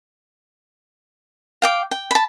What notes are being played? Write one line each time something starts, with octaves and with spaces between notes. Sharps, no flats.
F5 G5 D6
G5
A5 B5